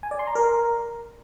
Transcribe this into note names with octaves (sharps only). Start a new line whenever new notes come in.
G#5
D5
C6
A#5
A#4